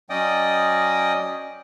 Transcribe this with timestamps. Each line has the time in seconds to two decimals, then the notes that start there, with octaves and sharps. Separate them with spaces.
0.10 F#3 C#4 D5 D#5 G5 D#6